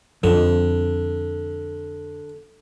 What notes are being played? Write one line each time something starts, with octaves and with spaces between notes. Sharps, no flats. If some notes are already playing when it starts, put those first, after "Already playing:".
F2 D3